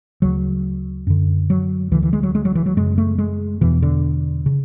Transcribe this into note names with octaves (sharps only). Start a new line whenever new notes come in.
D2 C#3 F#3
F#2 D3
F#3
D2 D3 E3
E3
G#3
F#3
G#3
F#3
E3
F#3
F#2 C#3 G#3
A3
G#3
E2 B2 E3
D3
C#3